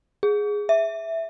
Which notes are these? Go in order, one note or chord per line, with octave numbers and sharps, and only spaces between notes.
G#4
E5